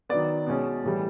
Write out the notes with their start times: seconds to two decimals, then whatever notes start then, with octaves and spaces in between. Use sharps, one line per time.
0.09 D#3 F#3 B3 D5
0.47 B2 G#3 C#4
0.83 A2 E3 G3